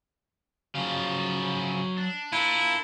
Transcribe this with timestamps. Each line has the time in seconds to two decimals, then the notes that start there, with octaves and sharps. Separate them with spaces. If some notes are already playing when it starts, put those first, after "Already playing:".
0.75 C#3 F3 F#3 F5
1.98 D4
2.32 E4 F4 A#4